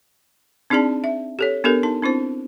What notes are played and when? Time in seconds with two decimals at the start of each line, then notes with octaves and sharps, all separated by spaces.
0.70 C4 D4 D#4 G#4 D5 A5
1.04 E5
1.39 G4 A4 C#5
1.64 B3 D4 G4 A4 A#4
1.83 D#4 A5
2.02 C4 D4 E4 C5